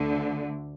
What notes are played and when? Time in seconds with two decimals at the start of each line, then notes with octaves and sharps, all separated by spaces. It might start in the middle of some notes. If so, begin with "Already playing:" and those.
Already playing: D2 D3